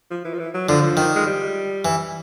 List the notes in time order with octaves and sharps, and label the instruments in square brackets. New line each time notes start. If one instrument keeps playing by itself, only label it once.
[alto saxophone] F3
E3
F3
E3
F#3
[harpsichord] D3 [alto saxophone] F3
[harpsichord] D#3
[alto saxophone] G#3
G3
[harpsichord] E3